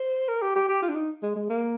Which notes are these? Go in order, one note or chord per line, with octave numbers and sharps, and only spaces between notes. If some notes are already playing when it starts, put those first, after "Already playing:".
Already playing: C5
A#4
G4
G4
G4
F4
D4
D#4
G#3
G#3
A#3